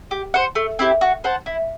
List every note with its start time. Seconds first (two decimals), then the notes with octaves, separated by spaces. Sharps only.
0.11 G4
0.34 C5 F#5
0.55 A3
0.79 C4 E4 G4
1.01 F#4
1.24 C5 F#5 A5
1.46 E4